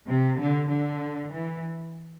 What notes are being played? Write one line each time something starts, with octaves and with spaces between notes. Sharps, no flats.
C3
D3
D3
E3